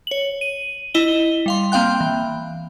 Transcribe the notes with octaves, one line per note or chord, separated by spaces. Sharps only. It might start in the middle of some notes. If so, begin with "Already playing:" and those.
C#5 F#7
D#7
E4 D#5 E7 G7
G3 F5 C6
A#3 C4 F5 G5 F#6
E3